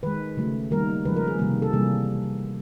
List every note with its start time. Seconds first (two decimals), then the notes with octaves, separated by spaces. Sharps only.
0.03 D#3 G#3 B4
0.37 C#3 F#3 A3
0.71 D#3 G3 A#3 A#4
1.05 C#3 F3 G#3 B4
1.16 A#4
1.28 G#4
1.39 C3 D#3 G3 A#3
1.62 A4
1.73 C3 E3 G3 A#3 G#4